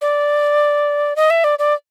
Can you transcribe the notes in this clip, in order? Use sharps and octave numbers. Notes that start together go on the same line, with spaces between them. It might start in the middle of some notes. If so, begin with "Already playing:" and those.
D5
D#5
E5
D5
D5